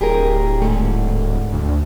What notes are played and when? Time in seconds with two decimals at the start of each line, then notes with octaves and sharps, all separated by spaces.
0.01 D1 G4 G#4 A#4
0.62 G#2 D3 A3
1.53 D2